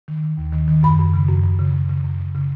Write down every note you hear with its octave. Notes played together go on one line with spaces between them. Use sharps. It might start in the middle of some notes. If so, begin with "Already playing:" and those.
D#3
D#3
D#2
D#3
D#3
F#2 B5
F#2
C#3
F#2
F#2
C#3
F#2
C#3
F#2
C#3
C#3